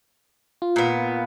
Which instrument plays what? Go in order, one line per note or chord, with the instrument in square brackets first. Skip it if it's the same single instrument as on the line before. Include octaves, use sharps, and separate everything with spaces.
[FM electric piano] F4
[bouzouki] A#2 B3